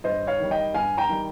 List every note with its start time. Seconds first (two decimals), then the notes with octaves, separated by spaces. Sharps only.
0.04 G2 C5 D#5
0.27 C#5 F5
0.39 D#3 G3
0.51 D#5 G5
0.74 G2 F5 G#5
0.98 G5 A#5
1.09 D#3 G3